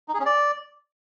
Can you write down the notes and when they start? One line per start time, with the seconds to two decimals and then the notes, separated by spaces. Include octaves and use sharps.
0.08 D#4
0.14 G#4
0.20 C#4
0.26 D5